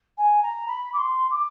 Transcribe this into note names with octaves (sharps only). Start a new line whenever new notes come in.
G#5
A#5
B5
D6
C6
D6